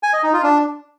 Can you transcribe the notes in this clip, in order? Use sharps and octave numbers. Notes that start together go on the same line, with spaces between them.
G#5
D#5
D#4
F4
D4